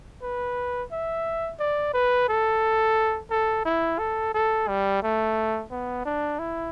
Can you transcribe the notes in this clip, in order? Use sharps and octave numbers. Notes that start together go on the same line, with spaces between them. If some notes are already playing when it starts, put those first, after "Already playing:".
B4
E5
D5
B4
A4
A4
E4
A4
A4
G3
A3
B3
D4
E4